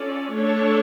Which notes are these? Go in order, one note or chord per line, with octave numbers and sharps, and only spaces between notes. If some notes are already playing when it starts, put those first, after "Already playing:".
Already playing: C#4 F4 A4 D5
A3 D4 A4 C#5